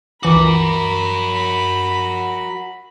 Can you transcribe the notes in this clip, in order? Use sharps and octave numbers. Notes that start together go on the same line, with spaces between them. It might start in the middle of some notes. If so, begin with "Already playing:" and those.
C#2 E3 F#4 A#4 B5 D6